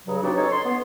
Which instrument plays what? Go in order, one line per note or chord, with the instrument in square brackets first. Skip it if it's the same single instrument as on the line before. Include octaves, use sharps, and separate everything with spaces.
[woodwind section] G2 C#3 F#3
B3 C4 D4 D#4 F#4 G4
C#4 D#4 A4 C#5
C6
B3